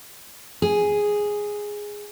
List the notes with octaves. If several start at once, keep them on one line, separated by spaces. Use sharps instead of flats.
G#4